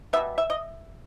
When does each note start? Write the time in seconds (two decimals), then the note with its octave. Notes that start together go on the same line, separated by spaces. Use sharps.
0.13 B2 G3 B3 E5
0.38 E5
0.50 D#5